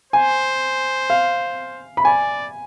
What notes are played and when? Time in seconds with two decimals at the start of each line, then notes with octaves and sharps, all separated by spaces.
0.13 C5 G#5
1.10 F5
1.97 B5
2.05 D5 G#5